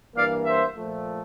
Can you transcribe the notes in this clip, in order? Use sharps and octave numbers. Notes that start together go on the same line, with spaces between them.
G2 E3 A#3 D5 F5
C5 E5
A#2 F3 A3